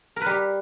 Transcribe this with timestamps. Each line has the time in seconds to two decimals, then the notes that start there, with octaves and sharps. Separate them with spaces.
0.16 A#4
0.21 B4
0.26 G3
0.31 G4